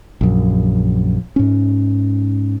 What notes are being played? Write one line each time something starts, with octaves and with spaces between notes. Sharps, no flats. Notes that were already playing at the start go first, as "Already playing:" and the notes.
A#1 F#2
G#2 C#4